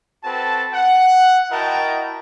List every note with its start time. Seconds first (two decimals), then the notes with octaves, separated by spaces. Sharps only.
0.24 C4 F#4 A4 B4 A5
0.73 F#5
1.50 E4 F#4 A#4 D#5 G5 A5